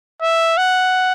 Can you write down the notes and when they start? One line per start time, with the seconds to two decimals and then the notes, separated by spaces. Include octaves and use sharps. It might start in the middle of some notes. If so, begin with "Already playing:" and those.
0.22 E5
0.57 F#5